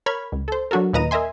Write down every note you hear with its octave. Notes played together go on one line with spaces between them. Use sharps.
A#4 C#5 B5 F6 G#6
C#2
A4 C5
F#3 D4 F#4 A4 A#4
D#2 A#2 B4 D#5 A#5 D#7
A#4 D#5 E5 G#5 C6